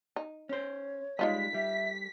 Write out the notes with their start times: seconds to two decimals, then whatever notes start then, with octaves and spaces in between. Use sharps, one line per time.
0.16 D#4
0.49 C#4 C5 C#5
1.19 G3 G#3 D#4 F4 D#5 B6
1.54 G3 E5